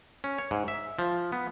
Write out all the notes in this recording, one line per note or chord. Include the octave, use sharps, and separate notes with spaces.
C#4
C#5
G#2
E5
F3
B3